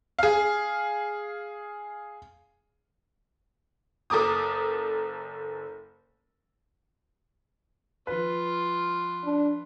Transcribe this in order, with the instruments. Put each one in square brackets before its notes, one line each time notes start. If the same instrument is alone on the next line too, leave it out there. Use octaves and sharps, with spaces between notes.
[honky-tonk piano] G#4 F5
F#1 A4 A#4 D6 D#6
[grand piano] F3 B4 [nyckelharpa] F4
[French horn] D4